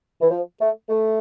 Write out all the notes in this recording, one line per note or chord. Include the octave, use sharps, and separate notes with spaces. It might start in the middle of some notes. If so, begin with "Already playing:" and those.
E3
F3
A3
A3